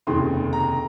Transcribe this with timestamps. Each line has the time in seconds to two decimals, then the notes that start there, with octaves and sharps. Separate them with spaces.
0.07 F1 D#2 C#3 C6
0.53 A#5